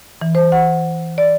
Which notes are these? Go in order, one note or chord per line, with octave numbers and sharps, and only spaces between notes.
E3
C5
F#5
D5